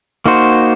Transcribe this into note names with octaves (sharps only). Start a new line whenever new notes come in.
A#3 D#4 F#4 C5